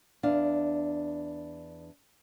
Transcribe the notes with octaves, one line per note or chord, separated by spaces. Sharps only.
E2 D4 F5